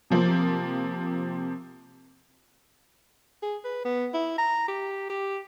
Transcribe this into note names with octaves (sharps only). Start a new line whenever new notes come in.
C3 F3 A#3 C4
G#4
B4
B3
E4
A#5
G4
G4